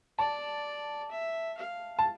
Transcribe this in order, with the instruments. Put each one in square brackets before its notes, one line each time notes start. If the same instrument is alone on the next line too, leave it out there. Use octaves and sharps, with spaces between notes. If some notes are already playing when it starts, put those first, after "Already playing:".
[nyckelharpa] D5 [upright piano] A5
[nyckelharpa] E5
F5
[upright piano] A5